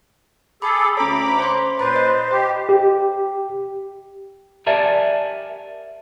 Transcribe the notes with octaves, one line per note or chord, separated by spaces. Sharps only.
G#4 A4 B5 D6
D2 C#4 C#5 A#5 B5 D6
C5 C#5 C6
A#2 B4 C5 B5 A6
D#5
G4 D#5
G4
G4 A#4 D5 E5 G#5 A5